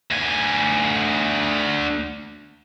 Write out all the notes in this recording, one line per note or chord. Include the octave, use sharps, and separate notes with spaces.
D2 G#5